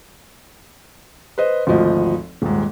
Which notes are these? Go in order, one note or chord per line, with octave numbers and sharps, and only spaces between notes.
B4 C5 D#5
G#1 D2 F3 D#5
D#1 G#2